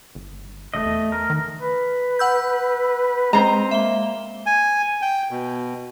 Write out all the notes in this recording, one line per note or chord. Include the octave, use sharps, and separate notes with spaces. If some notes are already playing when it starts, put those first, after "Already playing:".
G1
E1 A3 D#5
E2
A#4
D#3
B4
F#5 E6 G6
G#3 C4 C5 D#5 A#5
A#3 E5 G7
G#5
G5
B2